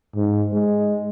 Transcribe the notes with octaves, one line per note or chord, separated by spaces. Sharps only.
G#2
G#3